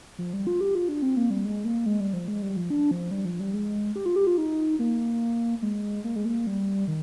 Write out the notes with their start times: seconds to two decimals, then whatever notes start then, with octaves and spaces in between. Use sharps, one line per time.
0.18 F3
0.33 G3
0.47 F4
0.61 G4
0.75 F4
0.89 D4
1.02 C4
1.17 A#3
1.30 G3
1.45 G#3
1.65 A#3
1.86 G#3
2.00 G3
2.13 F3
2.28 G#3
2.42 G3
2.56 F3
2.70 D4
2.91 F3
3.11 G3
3.25 F3
3.40 G3
3.54 G#3
3.96 G4
4.06 F4
4.16 G4
4.27 F4
4.38 D#4
4.79 A#3
5.62 G#3
6.04 A#3
6.16 G#3
6.25 A#3
6.47 G3
6.88 D#3